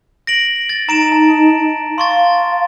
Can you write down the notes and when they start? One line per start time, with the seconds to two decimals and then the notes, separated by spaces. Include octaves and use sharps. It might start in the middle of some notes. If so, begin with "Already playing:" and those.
0.27 A#6 D7 F#7
0.69 A6
0.89 D#4 A#5 D7 E7
1.12 A5
1.98 F5 C6 C#6 A6